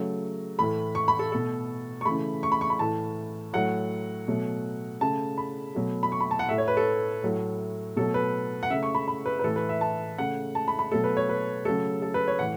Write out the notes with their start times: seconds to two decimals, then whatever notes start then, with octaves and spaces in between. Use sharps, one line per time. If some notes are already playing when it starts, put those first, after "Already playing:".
Already playing: C#3 F#3 A3
0.58 A2 E3 A3 B5
0.95 C#6
1.08 B5
1.19 A4
1.32 B2 A3 A4
2.01 C#6
2.05 C#3 E3 A3 B5
2.43 C#6
2.52 B5
2.61 C#6
2.70 B5
2.79 A2 E3 A3 A5
3.53 A2 F#3 A3 F#5
4.28 B2 F#3 A3
5.01 C#3 A3 A5
5.38 B5
5.75 B2 F#3 A3
6.03 B5
6.12 C#6
6.20 B5
6.31 A5
6.39 F#5
6.49 A2 A3 E5
6.58 C#5
6.68 B4
6.77 A4
7.23 A2 F#3 A3
7.96 B2 F#3 A3 A4
8.14 B4
8.63 F#5
8.70 C#3 A3 E5
8.83 C#6
8.95 B5
9.08 B5
9.26 B4
9.39 B4
9.44 A2 E3 A3 A4
9.56 B4
9.69 E5
9.81 A5
10.18 C#3 A3 F#5
10.55 A5
10.68 B5
10.79 B5
10.92 B2 F#3 A3 A4
11.04 B4
11.17 C#5
11.29 B4
11.65 C#3 F#3 A3 A4
12.02 A4
12.14 B4
12.28 C#5
12.39 A2 E3 F#5